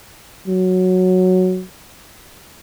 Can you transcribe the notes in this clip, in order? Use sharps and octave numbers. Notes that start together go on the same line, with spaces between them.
F#3